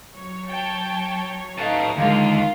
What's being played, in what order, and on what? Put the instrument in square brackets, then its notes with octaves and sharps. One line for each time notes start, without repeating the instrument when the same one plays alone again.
[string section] F#3 C#5
[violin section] G5 A5
[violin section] A3 D#4 F5 [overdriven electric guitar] B4 A5
[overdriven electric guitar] D#2 [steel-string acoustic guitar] D3 G#3 [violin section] F4 A#4 F5